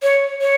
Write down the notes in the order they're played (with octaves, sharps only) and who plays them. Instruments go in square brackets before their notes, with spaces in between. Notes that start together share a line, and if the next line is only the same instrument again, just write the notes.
[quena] C#5
C#5